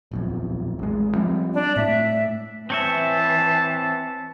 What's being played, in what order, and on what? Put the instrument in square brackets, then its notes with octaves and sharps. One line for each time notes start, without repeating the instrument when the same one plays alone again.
[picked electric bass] D#1 B1 F2
A1 G#3
F3 G3 C4
[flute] D4
[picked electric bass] A2 A3 [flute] E5
[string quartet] E3 [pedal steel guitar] C4 C#5 E5 [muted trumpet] A5